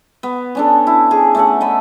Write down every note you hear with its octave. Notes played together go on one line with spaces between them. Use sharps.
B3
C#4 D4 A4
E4
G#4
A3 C#4 F#5
D#5 A5 B5